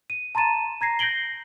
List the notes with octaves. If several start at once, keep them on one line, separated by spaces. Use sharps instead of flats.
D#7
A5 A#5 C6 A6 D#7 E7
A#5 G#6 A#6 C7
G6 A#6 C7 D7 F#7 G7